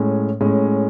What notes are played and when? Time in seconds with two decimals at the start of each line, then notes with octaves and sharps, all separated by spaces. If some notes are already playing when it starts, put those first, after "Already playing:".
Already playing: A2 G#3 C#4
0.41 A2 G#3 C#4